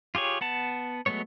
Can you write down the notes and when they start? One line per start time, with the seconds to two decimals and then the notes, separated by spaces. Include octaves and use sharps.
0.15 F4 G4 G#4 C#5
0.41 B3 F#5 A5
1.06 F#3 G#3 A3 B3 C#5